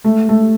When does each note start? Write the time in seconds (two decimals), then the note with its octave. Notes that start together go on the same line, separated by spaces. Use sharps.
0.04 A3
0.29 A3